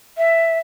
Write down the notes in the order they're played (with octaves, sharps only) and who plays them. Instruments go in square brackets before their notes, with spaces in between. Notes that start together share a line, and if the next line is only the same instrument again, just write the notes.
[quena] E5